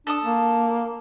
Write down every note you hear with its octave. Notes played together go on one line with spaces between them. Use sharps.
D4 A4 A5 D#6
A#3